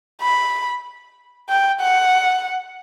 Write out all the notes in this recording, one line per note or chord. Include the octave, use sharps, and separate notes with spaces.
B5
G5
F#5